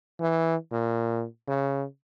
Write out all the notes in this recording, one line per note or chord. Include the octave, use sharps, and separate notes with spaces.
E3
A#2
C#3